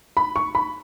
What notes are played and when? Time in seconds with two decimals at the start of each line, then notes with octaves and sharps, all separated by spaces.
0.17 B5
0.36 C#6
0.55 B5